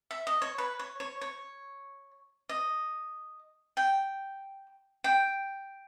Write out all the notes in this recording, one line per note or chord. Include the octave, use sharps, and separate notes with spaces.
E5
D#5
C#5
B4
C#5
C#5
C#5
D#5
G5
G5